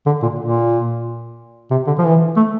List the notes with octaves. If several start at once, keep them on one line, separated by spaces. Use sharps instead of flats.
D3
A#2
A#2
C3
D3
F3
E3
A3